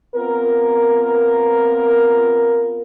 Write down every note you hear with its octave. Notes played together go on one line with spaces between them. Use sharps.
B3 C4 F4 A#4